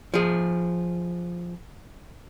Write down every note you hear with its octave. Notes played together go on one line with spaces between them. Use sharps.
F3 G#4